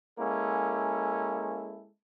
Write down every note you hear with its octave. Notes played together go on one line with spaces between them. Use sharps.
G#3 A#3 C#4 E4 A4